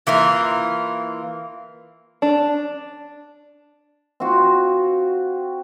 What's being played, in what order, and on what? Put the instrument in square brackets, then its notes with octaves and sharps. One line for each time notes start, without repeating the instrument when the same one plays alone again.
[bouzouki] E3 A#3 F4
[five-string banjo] D4
[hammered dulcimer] C4 F4 F#4